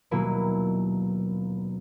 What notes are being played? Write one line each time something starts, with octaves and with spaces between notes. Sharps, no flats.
D#1 B2 F#3 A#3 E4 B4